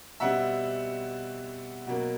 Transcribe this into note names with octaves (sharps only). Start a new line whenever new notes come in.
B2 G3 C4 E5 F#5
B2 F#3 A#3